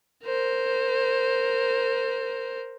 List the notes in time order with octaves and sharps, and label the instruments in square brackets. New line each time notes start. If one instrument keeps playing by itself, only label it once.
[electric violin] A#4 C5